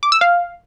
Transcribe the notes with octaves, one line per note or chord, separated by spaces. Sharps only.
D6
E6
F5